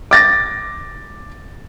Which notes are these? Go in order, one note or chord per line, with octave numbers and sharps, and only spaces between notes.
D6 A6 A#6